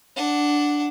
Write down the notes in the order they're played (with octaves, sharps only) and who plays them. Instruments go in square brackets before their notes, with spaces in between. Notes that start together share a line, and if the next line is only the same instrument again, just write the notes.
[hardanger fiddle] D4 F#5